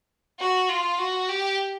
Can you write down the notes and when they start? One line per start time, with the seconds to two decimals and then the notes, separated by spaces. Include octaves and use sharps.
0.40 F#4
0.69 F4
0.98 F#4
1.29 G4